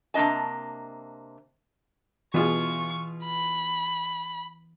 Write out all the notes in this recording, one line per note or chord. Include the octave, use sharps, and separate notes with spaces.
C3 A#3 D4 D#5 A5
B2 E3 F4 G#4 C#6
B5